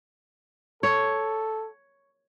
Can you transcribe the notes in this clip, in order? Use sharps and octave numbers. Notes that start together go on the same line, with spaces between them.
A4 C#5